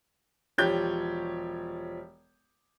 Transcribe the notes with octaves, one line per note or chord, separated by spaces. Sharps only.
E1 F3 G4 C#5 G6